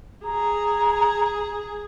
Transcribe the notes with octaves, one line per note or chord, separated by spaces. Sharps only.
G#4 A#5